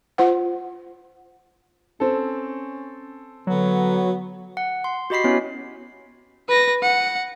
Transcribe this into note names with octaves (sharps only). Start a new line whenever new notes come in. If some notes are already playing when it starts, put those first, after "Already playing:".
F4 C5 F#5
C4 C#4 A4
D3 F#3 B3
F#5
C6
F#4 G4 D#5 B5 B6 C7
B3 C#4 E4 F#4 C#5
B4 A#6
F#5